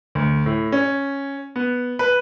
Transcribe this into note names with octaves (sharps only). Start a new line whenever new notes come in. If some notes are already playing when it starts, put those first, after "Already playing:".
D2
A2
C#4
B3
B4